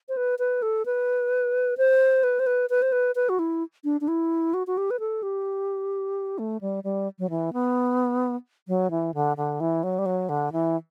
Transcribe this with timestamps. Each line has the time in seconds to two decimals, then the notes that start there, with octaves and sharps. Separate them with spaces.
0.09 C5
0.17 B4
0.39 B4
0.62 A4
0.86 B4
1.78 C5
2.24 B4
2.39 C5
2.47 B4
2.70 B4
2.82 C5
2.92 B4
3.16 B4
3.29 F#4
3.39 E4
3.84 D4
4.01 D4
4.08 E4
4.54 F#4
4.67 F#4
4.77 G4
4.91 B4
5.00 A4
5.23 G4
6.39 A3
6.61 G3
6.84 G3
7.19 F#3
7.30 E3
7.53 B3
8.68 F#3
8.91 E3
9.14 D3
9.37 D3
9.60 E3
9.83 F#3
9.99 G3
10.06 F#3
10.29 D3
10.52 E3